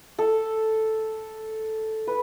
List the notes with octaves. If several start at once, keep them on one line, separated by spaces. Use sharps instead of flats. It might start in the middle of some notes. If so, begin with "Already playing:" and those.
A4
B4